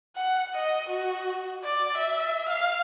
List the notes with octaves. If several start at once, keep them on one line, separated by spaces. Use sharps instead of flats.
F#5
D#5
F#4
D5
E5
F5